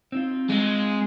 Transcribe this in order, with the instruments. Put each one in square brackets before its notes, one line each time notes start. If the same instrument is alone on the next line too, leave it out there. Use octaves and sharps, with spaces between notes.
[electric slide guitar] C4 D#4 F4
[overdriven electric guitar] G#3